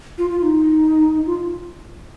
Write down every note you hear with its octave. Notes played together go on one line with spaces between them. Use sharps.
F4
F4
D#4
F4